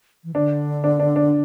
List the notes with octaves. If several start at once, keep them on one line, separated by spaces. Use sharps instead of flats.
E3
D3 D4
D4
D4
D4